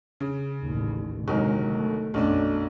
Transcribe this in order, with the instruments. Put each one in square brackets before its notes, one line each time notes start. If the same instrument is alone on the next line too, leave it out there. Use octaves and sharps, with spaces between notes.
[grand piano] C#3
[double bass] A1 D#2
[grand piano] G1 D#3 F#3 [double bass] C3 G#3
[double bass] A3
[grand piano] B1 C#4 D4 [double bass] F#2 A3